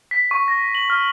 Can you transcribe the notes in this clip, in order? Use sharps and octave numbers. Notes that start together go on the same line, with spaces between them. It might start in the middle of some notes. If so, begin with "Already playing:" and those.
B6
C#6
A#6
F#7
F6